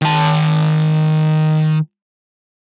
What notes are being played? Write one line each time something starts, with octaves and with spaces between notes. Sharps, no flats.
D#3 A5